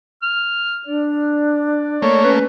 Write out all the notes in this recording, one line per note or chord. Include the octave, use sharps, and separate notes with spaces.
F6
D4 D5
A3 A#3 C#5
C#4 B4